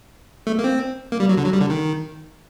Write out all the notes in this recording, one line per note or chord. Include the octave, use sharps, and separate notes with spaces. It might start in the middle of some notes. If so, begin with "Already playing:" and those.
A3
A#3
C4
A#3
G3
F#3
D3
F#3
G3
D3
D#3